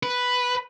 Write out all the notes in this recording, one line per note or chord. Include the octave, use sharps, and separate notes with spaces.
B4